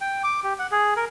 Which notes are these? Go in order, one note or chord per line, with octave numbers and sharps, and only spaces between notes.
G5
D6
G4
F#5
G#4
A#4